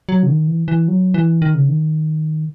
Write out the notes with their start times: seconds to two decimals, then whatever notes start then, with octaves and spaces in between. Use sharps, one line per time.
0.09 F#3
0.23 C#3
0.28 D#3
0.48 E3
0.68 E3
0.88 F#3
1.14 E3
1.42 D#3
1.55 C#3
1.69 D#3